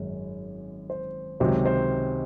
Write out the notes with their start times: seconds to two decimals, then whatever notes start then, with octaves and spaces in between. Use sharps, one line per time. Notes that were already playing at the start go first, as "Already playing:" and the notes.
Already playing: G#1 F#2 G#3
0.90 C5
1.40 C#2 C3 D#3 F#3 C5
1.65 C5